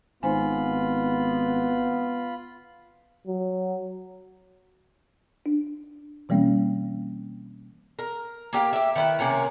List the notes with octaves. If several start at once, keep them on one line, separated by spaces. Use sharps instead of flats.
G#1 B3 D#4 F4 C5 G#5 B5
F#3
D4
B2 E3 G3 A#3 C4 C#4
A#4
A#3 G4 F5
G4 E5
D#3 E4 B4
C3 A#3 C#4 A#4